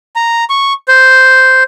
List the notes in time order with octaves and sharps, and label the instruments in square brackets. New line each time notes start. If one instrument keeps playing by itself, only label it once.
[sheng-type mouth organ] A#5
C#6
C5